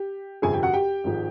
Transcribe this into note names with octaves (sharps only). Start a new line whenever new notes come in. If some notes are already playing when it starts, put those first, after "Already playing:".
Already playing: G4
G1 F2 C3 G#4 G#5
G4 G5
F#4 F#5
G4 G5
G#1 G#2 F3 G#3